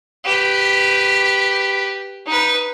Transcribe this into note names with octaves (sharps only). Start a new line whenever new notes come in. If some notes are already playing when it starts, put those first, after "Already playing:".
G4 B4
D#4 B4